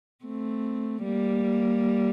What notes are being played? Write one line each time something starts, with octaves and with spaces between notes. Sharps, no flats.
A3 C4
G3 A#3